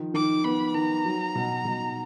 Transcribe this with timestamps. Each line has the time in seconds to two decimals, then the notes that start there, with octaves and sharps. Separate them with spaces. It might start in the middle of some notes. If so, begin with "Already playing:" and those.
Already playing: D#3 F3
0.14 D#3 D6
0.44 B3 B5
0.74 D#3 A#5
1.05 F#3
1.35 B2
1.65 B2